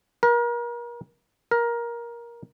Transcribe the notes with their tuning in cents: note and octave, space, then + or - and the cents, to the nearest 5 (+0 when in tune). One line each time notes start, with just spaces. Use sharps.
A#4 +35
A#4 +15